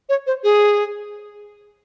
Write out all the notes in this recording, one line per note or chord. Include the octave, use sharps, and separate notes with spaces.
C#5
C5
G#4